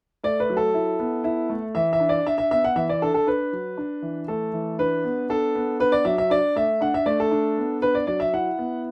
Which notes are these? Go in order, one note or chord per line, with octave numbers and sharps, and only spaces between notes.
A3 D5
B4
F#3
A4
E4
B3
E4
A3
E3 E5
E5
D4
D5
D4 E5
E5
B3 E5
F#5
E3 E5
D5
D4 A4
A4
D4 B4
F#3
D4
E3
A3 A4
E3
D4 B4
B3
D4 A4
B3
D4 B4
D5
F#3 E5
E5
D4 D5
A3 E5
D4 F#5
E5
A3 D5
A4
D4
B3
D4 B4
D5
F#3 D5
E5
E4 F#5
B3